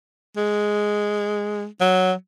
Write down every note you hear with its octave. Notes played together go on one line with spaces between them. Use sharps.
G#3
F#3